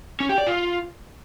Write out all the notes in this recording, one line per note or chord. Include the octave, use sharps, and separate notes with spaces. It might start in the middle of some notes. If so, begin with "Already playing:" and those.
C#4
G4
D5
F4